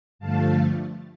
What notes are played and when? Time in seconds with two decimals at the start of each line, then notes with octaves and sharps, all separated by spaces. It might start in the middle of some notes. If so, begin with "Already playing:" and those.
0.19 G2 D3 F3 A3 F5 A5